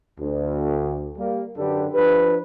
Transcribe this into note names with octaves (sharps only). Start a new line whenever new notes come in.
D2
G3 A#3
F#2 D3 D4 G4 A4 B4
F3 D4 G4 B4